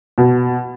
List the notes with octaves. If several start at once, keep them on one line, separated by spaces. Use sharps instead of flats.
B2